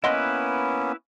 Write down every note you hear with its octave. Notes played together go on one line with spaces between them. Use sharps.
A#3 B3 C#4 E4 B4 D#5 F#5 C6